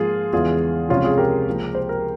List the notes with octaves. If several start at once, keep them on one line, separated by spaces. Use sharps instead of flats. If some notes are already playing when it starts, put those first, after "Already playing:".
Already playing: G#2 F3 A#3 F4 G#4
E2 C#3 E3 G#3 F4 G#4
C#2 C3 F3 C#4 F4
F4 G#4
G4 A#4
C#2 C#3 F3 A#3
C5
A#4